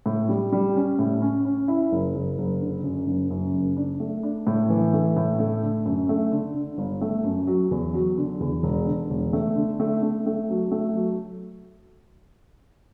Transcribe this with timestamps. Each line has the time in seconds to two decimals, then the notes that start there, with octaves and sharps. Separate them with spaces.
0.06 A2
0.29 G3
0.52 G3
0.76 C#4
0.99 A2
1.22 C#4
1.45 C#4
1.68 E4
1.92 F#1
2.15 F#1
2.38 F#1
2.61 D3
2.84 F#2
3.07 F#1
3.30 F#2
3.53 F#1
3.77 D4
4.00 A3
4.23 D4
4.47 A2
4.69 E3
4.93 A3
5.16 A2
5.39 A3
5.62 D3
5.85 F#2
6.09 A3
6.32 D3
6.55 D3
6.78 G1
7.01 A3
7.24 F#2
7.47 F#3
7.71 E2
7.94 F#3
8.18 D3
8.40 E2
8.63 E1
8.86 D3
9.10 E1
9.33 A3
9.56 D3
9.80 A3
10.02 A3
10.26 A3
10.49 F#3
10.72 A3
10.95 F#3